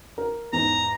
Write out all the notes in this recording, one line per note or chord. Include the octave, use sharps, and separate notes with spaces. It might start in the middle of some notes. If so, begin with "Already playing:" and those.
A#4
E2 G#2 A#5